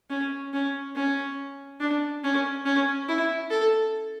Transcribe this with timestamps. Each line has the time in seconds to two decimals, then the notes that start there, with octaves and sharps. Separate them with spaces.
0.10 C#4
0.53 C#4
0.95 C#4
1.80 D4
2.24 C#4
2.65 C#4
3.08 E4
3.50 A4